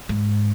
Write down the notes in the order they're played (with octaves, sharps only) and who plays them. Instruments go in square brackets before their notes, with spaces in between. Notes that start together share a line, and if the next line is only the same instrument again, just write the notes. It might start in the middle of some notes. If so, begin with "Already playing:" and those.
[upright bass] G#2